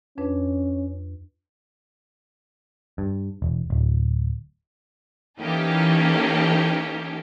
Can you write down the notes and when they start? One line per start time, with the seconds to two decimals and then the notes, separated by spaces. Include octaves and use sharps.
0.18 F2 C#4 D4 B4
2.98 G2
3.42 E1
3.70 D1
5.40 E3 A#3 C#4 D#4 G4 A4